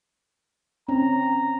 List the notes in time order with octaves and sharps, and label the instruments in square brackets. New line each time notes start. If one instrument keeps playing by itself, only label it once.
[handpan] C4 C#4 [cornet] A#5